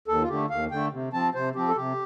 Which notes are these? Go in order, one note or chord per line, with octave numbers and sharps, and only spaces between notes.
D#2 A4
F4
D3 A3 G4
D#2 F5
D3 A3 G5
C3
F3 C4 A5
C3 C5
F3 C4 G4
A4
C3 G4